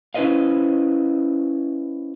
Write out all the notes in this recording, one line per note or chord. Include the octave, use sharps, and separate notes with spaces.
C#4 E4 B4 C5 D#5 F5